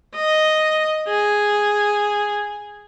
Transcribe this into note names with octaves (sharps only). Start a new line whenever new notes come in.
D#5
G#4